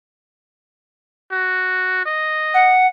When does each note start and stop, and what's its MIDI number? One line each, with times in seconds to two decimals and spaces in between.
1.32 2.01 66
2.06 2.76 75
2.53 2.86 78